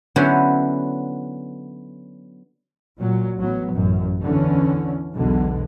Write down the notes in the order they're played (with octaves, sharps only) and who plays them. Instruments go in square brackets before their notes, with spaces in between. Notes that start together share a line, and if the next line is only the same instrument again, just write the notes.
[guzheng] D3 F#3 B3 C#4 E4 C5
[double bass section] A#2 F#3
A1 F#3 B3
A1 F#2
E2 D3 E3 C#4
B1 E2 B2 D3 G#3